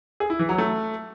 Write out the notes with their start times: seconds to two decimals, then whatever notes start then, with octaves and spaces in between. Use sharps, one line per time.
0.20 G#4
0.30 E4
0.39 E3
0.49 F#3
0.58 A3